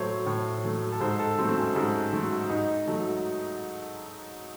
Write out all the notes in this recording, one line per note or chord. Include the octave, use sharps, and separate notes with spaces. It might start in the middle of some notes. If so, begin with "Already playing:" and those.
Already playing: A2 F#3 A3 C5 C#5
A2 C#5
F#3 A3
A4
G#2 C5
A4
F#3 A3 C4
C4
C#4
G#2
F#3 A3
G#2 D#4
F#3 A3